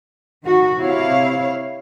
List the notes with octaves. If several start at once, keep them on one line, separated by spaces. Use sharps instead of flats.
D#3 F#4
C3 E4 C#5 F5